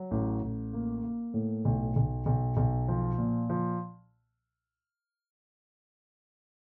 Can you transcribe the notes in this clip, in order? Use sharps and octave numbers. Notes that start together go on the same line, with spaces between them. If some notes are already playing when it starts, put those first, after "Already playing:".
Already playing: F#3
A1
A1
A#3
A#3
A2
B1
B1
B1
B1
F3
A#2
F3